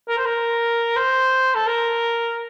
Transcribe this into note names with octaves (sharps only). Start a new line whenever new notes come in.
A#4
C5
A#4
C5
A4
A#4